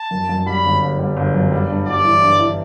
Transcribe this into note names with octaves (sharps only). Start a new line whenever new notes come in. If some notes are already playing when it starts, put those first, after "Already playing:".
Already playing: A5
F#2
F#2
G3 B5
G1
G1
G3
G1
F#2
G3
G2
G3 D5
E3
G2
E3